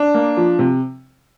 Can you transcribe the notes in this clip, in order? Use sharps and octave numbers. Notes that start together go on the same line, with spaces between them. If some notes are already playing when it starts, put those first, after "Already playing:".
Already playing: D4
A#3
F3
C3